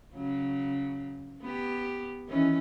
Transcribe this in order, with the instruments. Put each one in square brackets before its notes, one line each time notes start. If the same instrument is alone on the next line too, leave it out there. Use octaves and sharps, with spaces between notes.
[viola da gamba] C#3 F#3
B3 G4
D#3 E3 C#4